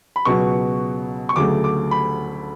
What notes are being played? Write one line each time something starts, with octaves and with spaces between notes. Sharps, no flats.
B5
C#2 B2 F#3 B3 C#6
C#6
D2 C#3 F#3 A3 D6
D6
B5